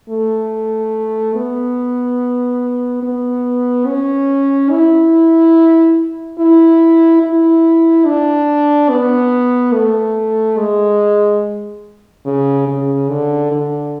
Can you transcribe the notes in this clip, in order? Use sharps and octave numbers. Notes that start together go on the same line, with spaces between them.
A3
B3
B3
C#4
E4
E4
E4
D4
B3
A3
G#3
C#3
C#3
D3
D3